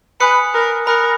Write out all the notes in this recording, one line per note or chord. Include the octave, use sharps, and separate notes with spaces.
B4 G#5 B5 D#6 F#6 C#7
A#4
A#4 G#5 B5 D#6 F#6 C#7